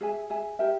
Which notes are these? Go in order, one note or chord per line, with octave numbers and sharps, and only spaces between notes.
G#4 E5 G#5
G#4 E5 G#5
G4 A#4 E5 G5